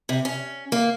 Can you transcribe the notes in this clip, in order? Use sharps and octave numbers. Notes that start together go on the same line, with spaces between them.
C3
C#4
A#3